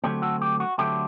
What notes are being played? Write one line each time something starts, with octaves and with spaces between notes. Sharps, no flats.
D3 F#3 A3 C4 G4
F#4 A4
G4
F#4
D3 F#3 A3 C4 G4